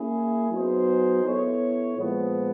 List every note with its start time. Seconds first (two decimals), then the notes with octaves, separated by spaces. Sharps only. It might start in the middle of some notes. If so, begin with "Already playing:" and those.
Already playing: A#3 C#4 E4 G#4
0.49 F#3 B3 D#4 G#4 C5
1.24 B3 E4 A4 C#5
1.97 A#2 F3 G#3 B3